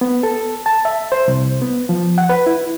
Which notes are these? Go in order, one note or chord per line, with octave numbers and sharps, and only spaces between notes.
B3
A4
A5
E5
C5
C2
B3
F3
F#5
B4
E4